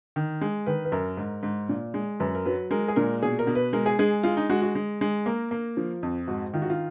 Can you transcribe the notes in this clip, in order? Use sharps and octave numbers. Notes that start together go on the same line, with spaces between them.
D#3
G#3
D#3 B4
B4
F#2 A#4
G#2
G#2
A#2
G#3
F#2 B4
A#4
F#3 B4
G#3 A#4
G#4
A#2 A#4
B2 G#4
A#4
B2
B4
G#3 A#4
G#4
G#3 G#4
G#3 F4
D#4
G#3 F#4
F#4
G#3
G#3
A#3 A#4
A#3
F3
F2
G#2 F#4
D#3 F4
F#4
F4